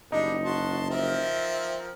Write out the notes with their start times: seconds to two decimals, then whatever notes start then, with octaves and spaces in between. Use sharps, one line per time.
0.12 F#1 G3 D4 D#4
0.44 F#4 A5 C6
0.90 F3 C4 A#4 E5